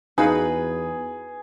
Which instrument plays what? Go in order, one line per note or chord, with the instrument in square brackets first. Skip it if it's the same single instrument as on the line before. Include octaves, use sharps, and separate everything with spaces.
[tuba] E2 [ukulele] D#4 F#4 F5 [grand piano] G#4 [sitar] B4